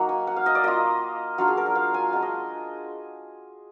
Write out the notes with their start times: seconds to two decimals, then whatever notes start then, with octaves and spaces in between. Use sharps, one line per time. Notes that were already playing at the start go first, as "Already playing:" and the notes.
Already playing: F#3 A#3 D#4 F#5
0.09 G#5
0.27 F#5
0.36 F5
0.46 D#5
0.55 D5
0.64 A#3 F4 D#5
1.38 F#3 D4 F4 F5
1.48 G#4
1.57 A#4
1.66 D5
1.75 F5
1.94 G#5
2.13 G#3 D4 F4 F#5
2.22 D#5